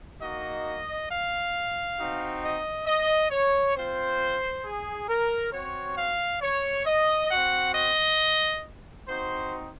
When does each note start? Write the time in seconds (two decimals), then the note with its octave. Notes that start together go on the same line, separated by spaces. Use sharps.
0.20 A#3 D#4 F#4 D#5
1.09 F5
1.98 C4 D#4 F#4
2.43 D#5
2.86 D#5
3.31 C#5
3.75 C4 F4 C5
4.63 G#4
5.08 A#4
5.52 C4 F#4 C#5
5.97 F5
6.41 C#5
6.86 D#5
7.30 C4 F#4 F#5
7.75 D#5
9.07 C4 D#4 F#4 C5